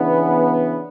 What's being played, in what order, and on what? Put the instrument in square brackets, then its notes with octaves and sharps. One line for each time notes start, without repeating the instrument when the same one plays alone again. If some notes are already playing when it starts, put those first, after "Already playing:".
Already playing: [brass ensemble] C#3 E3 B3 D4